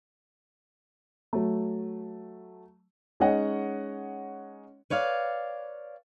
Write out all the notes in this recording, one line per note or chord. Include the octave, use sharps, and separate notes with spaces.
F#3 A3
G#3 C#4 D#4 C#5 D#5 F#5
B4 C#5 D5 F5